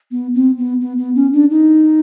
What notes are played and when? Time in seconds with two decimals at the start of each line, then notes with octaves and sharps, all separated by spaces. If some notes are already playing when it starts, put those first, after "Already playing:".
0.11 B3
0.35 C4
0.58 B3
0.81 B3
0.98 B3
1.15 C#4
1.33 D4
1.50 D#4